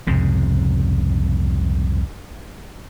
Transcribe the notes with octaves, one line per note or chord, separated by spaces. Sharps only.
C2 F2 G#2 C#3